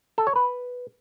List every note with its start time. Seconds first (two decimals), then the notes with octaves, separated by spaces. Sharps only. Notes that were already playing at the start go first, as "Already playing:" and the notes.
0.18 A4
0.27 C#5
0.36 B4